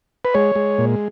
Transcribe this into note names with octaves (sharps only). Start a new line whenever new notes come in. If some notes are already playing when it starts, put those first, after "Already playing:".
B4
G#3 C#5
G#3
A#2